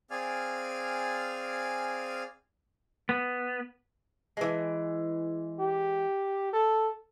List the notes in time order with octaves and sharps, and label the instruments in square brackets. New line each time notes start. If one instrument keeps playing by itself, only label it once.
[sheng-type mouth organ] C4 G#4 D5 F5 G#5 F6
[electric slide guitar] B3
[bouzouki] E3 G#3
[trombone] G4
A4